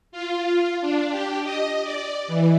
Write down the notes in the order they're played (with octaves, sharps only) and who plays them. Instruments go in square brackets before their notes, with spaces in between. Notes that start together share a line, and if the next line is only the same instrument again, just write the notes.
[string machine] F4
D4
G4
D#5
D5
E3